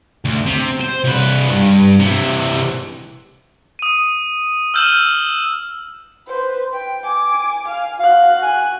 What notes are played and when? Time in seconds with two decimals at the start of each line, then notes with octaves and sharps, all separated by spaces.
0.25 D2
0.46 C3
0.80 C5
1.04 C2 B4
1.50 G2
1.99 C3 E3
3.79 D#6 D#7
4.74 E6 F6 G6 D#7 E7 F#7
6.27 B4 C5
6.70 B4 G5
7.04 G#5 D6
7.68 F5 G#5
8.00 F#4 F5 F#6
8.43 G#5